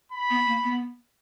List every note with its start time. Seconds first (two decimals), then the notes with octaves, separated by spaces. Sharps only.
0.12 B5
0.30 B3
0.46 A#3
0.64 B3